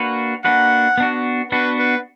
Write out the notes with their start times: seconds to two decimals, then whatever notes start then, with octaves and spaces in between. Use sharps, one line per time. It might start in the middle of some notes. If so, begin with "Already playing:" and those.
Already playing: A#3 D4 F#4 B4
0.44 A#3 D4 F#4 B4 F#5
0.98 B3 D4 F#4
1.52 B3 D4 F#4 B4
1.79 B4